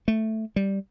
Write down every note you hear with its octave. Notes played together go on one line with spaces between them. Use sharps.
A3
G3